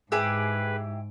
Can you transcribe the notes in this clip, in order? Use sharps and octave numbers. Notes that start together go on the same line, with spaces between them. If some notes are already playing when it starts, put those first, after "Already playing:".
G#2 E4 G4 G#4 B4